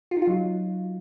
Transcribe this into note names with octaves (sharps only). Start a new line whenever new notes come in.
F4
D#4
F4
F#3